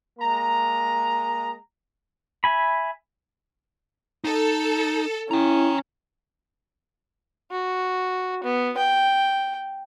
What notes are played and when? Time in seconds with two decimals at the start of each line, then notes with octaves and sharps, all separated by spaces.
0.20 G#3 A#3 A#5
2.44 E5 G#5 B5
4.24 D#4 A4
5.31 C#4 E4 G5 A#5
7.51 F#4
8.44 B3
8.77 G5